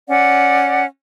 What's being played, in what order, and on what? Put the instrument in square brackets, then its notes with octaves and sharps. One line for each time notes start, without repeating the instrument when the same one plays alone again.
[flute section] C#4 D5 F#5